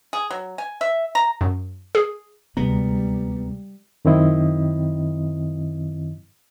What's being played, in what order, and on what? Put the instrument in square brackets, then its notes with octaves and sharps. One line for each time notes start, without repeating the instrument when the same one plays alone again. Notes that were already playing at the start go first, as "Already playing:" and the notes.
[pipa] G#4
F#3
G#5
E5
A#5
[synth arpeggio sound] F#2
G#4
[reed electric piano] D2 G#3 A#5 [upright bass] C3 [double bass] G3 [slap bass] B3
[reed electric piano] F#2 D#3 C4 E4 D#5